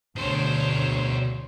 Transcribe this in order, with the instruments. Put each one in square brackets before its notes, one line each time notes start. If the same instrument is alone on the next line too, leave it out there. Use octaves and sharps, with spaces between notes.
[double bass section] D2 [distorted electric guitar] B2 D4 [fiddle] C5 C#5